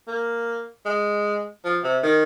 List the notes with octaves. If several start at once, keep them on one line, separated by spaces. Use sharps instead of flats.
A#3
G#3
F3
C3
D#3